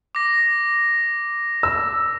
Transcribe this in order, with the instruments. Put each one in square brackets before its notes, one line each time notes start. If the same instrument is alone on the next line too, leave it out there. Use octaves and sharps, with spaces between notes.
[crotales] D6 A#6
[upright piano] E6